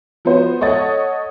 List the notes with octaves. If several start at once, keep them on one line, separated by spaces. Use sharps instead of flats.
F3 B3 F#4 C5
A4 C#5 D#5 F#5 A6